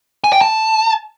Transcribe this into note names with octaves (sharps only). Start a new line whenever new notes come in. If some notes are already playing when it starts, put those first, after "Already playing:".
G#5
G5
A5